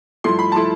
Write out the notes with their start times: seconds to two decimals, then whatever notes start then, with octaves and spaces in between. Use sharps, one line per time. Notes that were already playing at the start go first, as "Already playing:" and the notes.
0.24 G2 F3 A3 E4 C6
0.39 B5
0.52 F3 A3 E4 A5